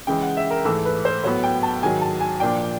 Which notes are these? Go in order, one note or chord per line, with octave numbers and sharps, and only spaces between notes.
C#3 E3 G#3 G5
F#5
E5
A#4
G#2 E3 A3 A4
B4
C5
A2 F#3 B3 C#5
G5
A5
G#2 D#3 F#3 G#5
A5
G#5
A#2 F3 A#3 D4 G5